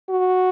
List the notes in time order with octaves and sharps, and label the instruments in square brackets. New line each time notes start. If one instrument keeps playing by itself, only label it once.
[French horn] F#4